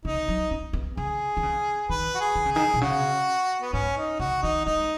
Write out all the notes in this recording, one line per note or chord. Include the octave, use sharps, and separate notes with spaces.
C#3 D#4
F#3
C#4
B3
C#3 G#4
D#3
C#3
D#3 B4
F#4
G#4
D#3
C#3
D#3 G#4
B2
C#3 F#4
B3
G#2 C#4
D#4
C#3 F#4
D#3 D#4
G#3 D#4